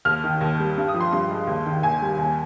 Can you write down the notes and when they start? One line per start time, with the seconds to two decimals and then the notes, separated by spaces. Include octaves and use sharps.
0.05 D#2 F6
0.24 D#3
0.41 D#2
0.59 G3
0.77 G2
0.88 D#6
0.94 F3
1.00 C6
1.12 G2 C6
1.30 G#3
1.47 D#2
1.66 D#3
1.83 D#2 G#5
2.01 G3
2.18 D#2